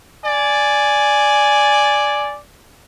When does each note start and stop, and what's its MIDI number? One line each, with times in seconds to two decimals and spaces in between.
0.25 2.40 74
0.25 2.35 80